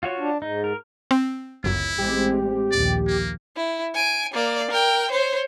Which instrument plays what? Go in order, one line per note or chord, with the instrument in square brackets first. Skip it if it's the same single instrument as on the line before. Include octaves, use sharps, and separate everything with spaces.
[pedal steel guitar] F4 F#4 C#5
[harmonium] D4
[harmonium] G#2 [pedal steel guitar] D#4
[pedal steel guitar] A#4
[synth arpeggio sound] C4
[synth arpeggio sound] G1 F#2 [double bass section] C#2 [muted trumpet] E4
[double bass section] A1 G#3 C4 [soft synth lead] G4
[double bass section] A#1 D#2 [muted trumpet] D5
[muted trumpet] A#3
[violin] E4
G#5 D7
A#3 D5
A#4 G5
C5 C#5